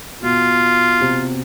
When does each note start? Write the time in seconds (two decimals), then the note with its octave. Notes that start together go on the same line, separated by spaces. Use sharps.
0.23 B2 F4
1.01 C3